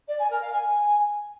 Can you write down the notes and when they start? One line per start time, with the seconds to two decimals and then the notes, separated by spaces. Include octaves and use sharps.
0.08 D5
0.19 G#5
0.30 A#4
0.42 F5
0.53 G#5